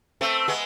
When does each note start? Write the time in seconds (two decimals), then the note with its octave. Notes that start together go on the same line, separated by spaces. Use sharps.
0.21 A3 C4
0.48 G#3 B3